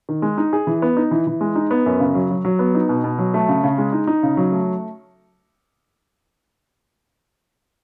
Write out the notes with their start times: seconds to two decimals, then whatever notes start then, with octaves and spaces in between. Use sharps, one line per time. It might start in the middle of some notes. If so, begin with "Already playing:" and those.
0.09 D#3
0.22 G#3
0.38 D#4
0.53 G#4
0.67 E3
0.82 B3
0.97 D#4
1.11 E3
1.27 E3
1.41 G#3
1.55 D#4
1.71 B3
1.86 F#2
2.00 C#3
2.15 F#3
2.31 F#3
2.45 F#3
2.59 B3
2.75 D#4
2.89 B2
3.04 B2
3.19 F#3
3.34 A3
3.49 C#3
3.64 C#3
3.78 G#3
3.93 D#4
4.07 D#4
4.23 C#3
4.37 F#3
4.52 A3